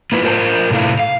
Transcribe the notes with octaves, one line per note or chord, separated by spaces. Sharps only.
A#3 E4 F4 B4
F4 A#4 C5 G5 A5
A2 C3 A3 E4 F5
F5